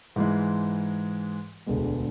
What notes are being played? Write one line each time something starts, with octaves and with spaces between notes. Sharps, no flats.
G#2 E3 G#3
E1 D2 D3 G#3 B3